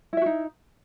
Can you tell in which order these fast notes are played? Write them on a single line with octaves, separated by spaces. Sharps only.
E4 E5 F#4 D#4